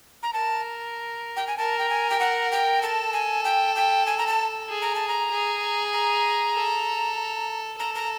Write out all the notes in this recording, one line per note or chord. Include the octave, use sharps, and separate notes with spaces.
A#5
A#4 A5
G5
G#5
A#4 A5
G5
G#5
G5
F#5
G5
A4 A5
G#5
G5
G5
G#5
A#5
A5
G#4
A#5
A5
A#5
G#4
A#5
A4
A4 A#5
A#5